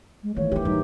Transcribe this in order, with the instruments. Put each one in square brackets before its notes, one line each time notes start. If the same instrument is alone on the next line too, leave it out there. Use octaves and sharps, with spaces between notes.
[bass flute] G#3
[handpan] D#3 E3 A3 [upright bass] A#3 [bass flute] C#5
[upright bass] A#3 D4 [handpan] G4
[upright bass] F#3 [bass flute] D#4